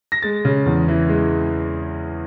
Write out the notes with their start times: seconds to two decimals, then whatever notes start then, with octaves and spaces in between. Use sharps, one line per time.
0.12 A#6
0.22 G#3 A6
0.45 C#3
0.66 E2
0.88 E3
1.09 G#3